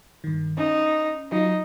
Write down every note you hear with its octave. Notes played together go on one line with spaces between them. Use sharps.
G2 D#3
C#4 D#4
F#3 D#4 F4